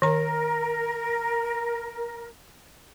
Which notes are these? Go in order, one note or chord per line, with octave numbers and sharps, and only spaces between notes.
D#3 A#4 A#5